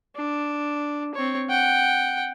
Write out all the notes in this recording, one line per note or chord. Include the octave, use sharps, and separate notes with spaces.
D4
C4 C#5
F#5 G5